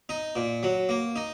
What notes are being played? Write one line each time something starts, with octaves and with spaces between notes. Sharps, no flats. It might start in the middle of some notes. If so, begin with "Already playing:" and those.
D#4
A#2
F#3
A#3
D#4